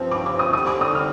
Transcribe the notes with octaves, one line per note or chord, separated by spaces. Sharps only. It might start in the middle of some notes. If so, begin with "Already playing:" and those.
Already playing: G2 F3 C4
D6
D6
D#6
D3 G3 C4 D#6
D6
D#6
F6